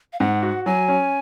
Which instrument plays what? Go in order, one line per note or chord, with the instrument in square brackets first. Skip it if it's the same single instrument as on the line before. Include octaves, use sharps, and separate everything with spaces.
[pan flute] F5
[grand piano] G#2 [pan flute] F#5
[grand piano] F#4
[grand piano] F#3 [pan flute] G#5
[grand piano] C#4